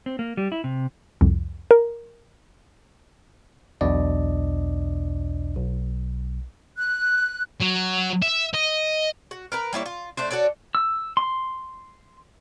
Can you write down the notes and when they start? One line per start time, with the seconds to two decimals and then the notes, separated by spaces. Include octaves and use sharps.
0.06 C4
0.19 A#3
0.37 G3
0.52 E4
0.64 C3
1.21 C2 F2
1.71 A#4
3.81 B1 E2 B2 D4 D5 D#5
5.57 B1
6.77 F#6
7.61 F#3
8.22 E5
8.54 D#5
9.31 F#4
9.52 A#4 B4 A#5
9.73 G3 A#3 E4 C#5
9.86 F4
10.17 A3 D4 C5
10.31 F#4 A4 C#5 D5
10.75 E6
11.17 C6